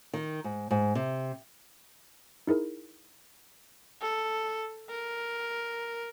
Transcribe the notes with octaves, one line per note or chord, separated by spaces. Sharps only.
D#3
G#2
G#2
C3
D#4 E4 G#4 A#4
A4
A#4